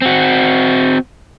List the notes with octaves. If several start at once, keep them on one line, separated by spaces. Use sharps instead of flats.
C4 F#4